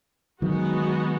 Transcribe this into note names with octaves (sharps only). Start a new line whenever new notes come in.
D#3 F#3 G#3 B3 D#4 F#4